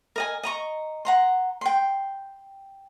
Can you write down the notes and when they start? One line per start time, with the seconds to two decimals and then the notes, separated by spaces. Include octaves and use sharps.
0.16 A#4 D#5 G#5
0.43 D#5 A#5 C#6
1.05 F#5 A#5 C6
1.61 G5 C6